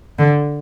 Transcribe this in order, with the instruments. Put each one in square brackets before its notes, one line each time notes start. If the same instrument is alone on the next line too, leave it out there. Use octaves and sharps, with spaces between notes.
[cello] D3